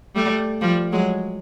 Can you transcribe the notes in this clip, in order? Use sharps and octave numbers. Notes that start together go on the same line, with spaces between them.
G3 A3
F3 G3
F#3 G#3